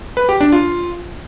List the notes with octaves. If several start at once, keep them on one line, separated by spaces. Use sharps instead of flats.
B4
G4
D4
F4